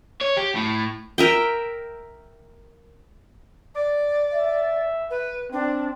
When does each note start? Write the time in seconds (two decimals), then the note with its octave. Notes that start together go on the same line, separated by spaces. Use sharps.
0.21 C#5
0.37 G4
0.55 A2
1.18 A#4 E5 G5
3.74 D5
4.34 E5
5.10 B4
5.52 C4 D4